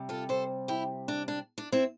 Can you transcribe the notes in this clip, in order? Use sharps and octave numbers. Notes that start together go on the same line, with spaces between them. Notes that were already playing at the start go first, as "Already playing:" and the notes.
Already playing: C3 G3
F4 A4
A4 C5
E4 G4
D4
D4
D4
C4 E4